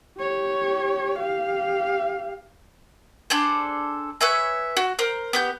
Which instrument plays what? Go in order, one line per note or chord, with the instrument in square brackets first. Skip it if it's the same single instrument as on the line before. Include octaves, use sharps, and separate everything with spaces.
[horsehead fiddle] G4 C#5
G4 F5
[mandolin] D4 G#4 A4 C5
B4 C#5 E5 G#5
F#4
A#4 C5
B3 G4 G6